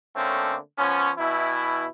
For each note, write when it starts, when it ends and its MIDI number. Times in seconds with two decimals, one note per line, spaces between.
0.15 0.55 50
0.15 0.55 57
0.15 0.55 58
0.15 0.55 60
0.15 0.55 61
0.78 1.10 53
0.78 1.10 59
0.78 1.10 61
1.18 1.84 47
1.18 1.84 52
1.18 1.84 64